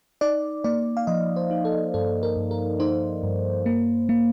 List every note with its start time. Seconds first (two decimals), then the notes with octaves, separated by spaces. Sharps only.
0.21 D#4 D5
0.64 A#3 D5
0.97 F5
1.07 F3 D#5
1.36 C5
1.51 D#4
1.65 A4
1.94 G2 A4
2.23 A#4
2.36 G2
2.51 A#4
2.80 D#4 C5
3.23 G2
3.66 A#3
4.09 A#3